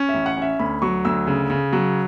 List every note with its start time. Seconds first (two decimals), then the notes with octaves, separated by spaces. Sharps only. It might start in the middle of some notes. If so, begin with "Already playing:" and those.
Already playing: C#4
0.09 E5
0.14 A1
0.26 F#5
0.37 C#4 E5
0.59 D2 B5
0.82 F#3 C#6
1.05 D2 E6
1.27 C#3
1.50 C#3
1.73 F#3